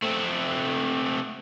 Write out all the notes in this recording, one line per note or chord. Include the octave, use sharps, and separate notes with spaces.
A3 C4